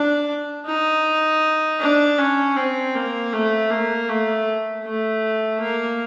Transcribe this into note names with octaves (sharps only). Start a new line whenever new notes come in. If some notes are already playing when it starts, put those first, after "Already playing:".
Already playing: D4
D#4
D4
C#4
C4
A#3
A3
A#3
A3
A3
A#3